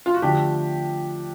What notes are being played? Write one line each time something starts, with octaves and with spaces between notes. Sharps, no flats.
F4
F#4
D3 F3 A3 D4 G4